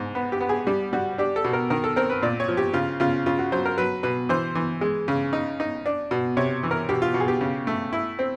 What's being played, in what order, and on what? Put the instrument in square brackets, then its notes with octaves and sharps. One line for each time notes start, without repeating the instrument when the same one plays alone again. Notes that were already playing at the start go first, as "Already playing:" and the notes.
Already playing: [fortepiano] G#2
B3
G4
B3
G#4
G3 G4
G3 F#4
D4 G4
A4
B2
A#4
D#3 A#4
A4
C4 A#4
B4
A#2 D5
C#5
F3
G4
C#3 F4
C#3 F4
C#3 F4
F#4
F#3 C5
A#4
F#3 B4
B2 B4
E3 C5
E3
G#3
C#3
D#4
D#4
D4
B2
C3 C#5
E3
A#4
B2 G4
F4
B2
G#4
G4
C#3
A3
E4
C4